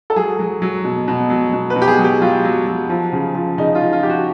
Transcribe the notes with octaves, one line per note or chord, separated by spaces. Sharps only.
A4
F#3 G#4
F#3
F#3
B2
B2
F#3
B2
B4
B2
G4
G#4
F#3
G4
F#3 F4
F#3
F#3
F3
C#3
F3
C#3 D#4
F4
F3
F4
F3 G4
F#4